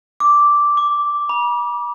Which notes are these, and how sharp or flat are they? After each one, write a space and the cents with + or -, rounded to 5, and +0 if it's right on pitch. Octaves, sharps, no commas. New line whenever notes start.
D6 -5
D6 -25
B5 -40